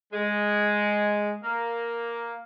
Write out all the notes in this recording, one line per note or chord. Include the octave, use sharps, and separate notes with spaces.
G#3
A#3